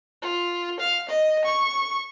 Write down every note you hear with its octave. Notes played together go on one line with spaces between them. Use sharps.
F4
F5
D#5
C#6